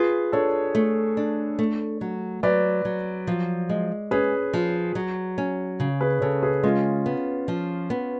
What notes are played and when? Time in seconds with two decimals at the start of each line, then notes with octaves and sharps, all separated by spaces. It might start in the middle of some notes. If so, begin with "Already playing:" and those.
Already playing: F4 G#4 B4
0.32 D4 A4 C#5
0.75 A3
1.17 D4
1.59 A3
2.01 F#3
2.43 F#3 B4 D5
2.85 F#3
3.27 F3
3.70 G#3
4.11 C#4 G#4 B4
4.53 F3
4.95 F#3
5.38 C#4
5.80 C#3
6.01 G#4 B4
6.21 C#3 A4 C#5
6.43 G#4 B4
6.63 G#3 C#4 F4
7.06 B3
7.48 F3
7.90 B3